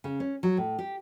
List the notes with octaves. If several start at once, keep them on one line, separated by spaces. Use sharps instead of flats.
C#3
C#4
F#3
A2
G4